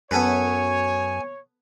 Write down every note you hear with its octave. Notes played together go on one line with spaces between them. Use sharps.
F#2 B3 A4 B4 C#5 G#5